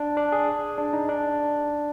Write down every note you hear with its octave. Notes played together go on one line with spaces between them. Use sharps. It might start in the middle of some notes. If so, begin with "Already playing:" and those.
Already playing: D4
D4
G#4
D4
D#4
D4